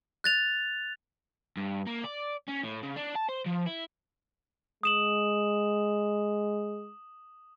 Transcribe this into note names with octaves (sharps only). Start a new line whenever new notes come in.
F#6 A6 F7
G2
A#3
D5
C#4
A2
C#3
D4
A5
C5
F3
E4
G#3 D#6 E7 F#7